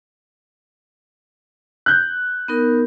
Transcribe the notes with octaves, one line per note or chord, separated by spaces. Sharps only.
F#6 G6
B3 D#4 A#4